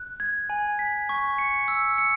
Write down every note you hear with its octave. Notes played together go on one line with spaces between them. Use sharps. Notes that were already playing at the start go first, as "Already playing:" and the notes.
Already playing: F#6
G#6
G#5
B6
C#6
C#7
E6
C#7